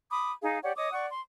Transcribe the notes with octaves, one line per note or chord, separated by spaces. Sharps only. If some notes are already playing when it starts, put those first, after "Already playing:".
B5 D6 D#6
D#4 G#4 F5
G4 C#5 D5 F#5
C#5 D#5 D6 D#6
D5 F#5 C#6
C6